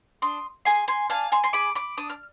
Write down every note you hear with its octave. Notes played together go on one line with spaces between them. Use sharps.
D4 C6 D#6
G#4 G#5 C6
G#5 C6
D4 F5 G#5
G#5 C6
C6
G#4 B5 D6
B5 D6
D4 D#6
F6